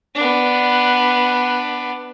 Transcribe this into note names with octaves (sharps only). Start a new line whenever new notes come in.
B3 D4